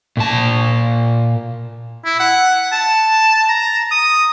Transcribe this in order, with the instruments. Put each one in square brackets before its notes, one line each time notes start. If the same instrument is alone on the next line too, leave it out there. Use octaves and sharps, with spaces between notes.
[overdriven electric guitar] A#2 A5
[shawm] E4
F#5
A5
A#5
D#6